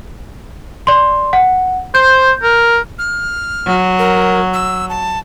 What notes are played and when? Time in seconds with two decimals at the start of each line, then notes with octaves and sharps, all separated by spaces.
0.87 D5 C6
1.33 F#5
1.95 C5 G6
2.43 A#4
2.99 F6
3.66 F#3
3.99 A#4
4.54 E6
4.89 A5